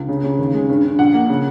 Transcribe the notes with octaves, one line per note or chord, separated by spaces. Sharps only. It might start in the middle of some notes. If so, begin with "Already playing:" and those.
Already playing: C#2
C#3
C#3
D#2
G#3
G2
G2
A#1 F#5
A#3
C#3